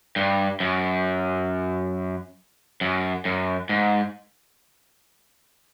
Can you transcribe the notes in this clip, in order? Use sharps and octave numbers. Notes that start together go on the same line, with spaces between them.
G2
F#2
F#2
F#2
G#2